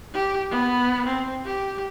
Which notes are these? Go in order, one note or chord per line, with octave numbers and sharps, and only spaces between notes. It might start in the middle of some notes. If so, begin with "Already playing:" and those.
G4
B3
C4
G4